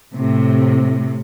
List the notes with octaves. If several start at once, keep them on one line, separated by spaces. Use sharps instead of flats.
A2 C3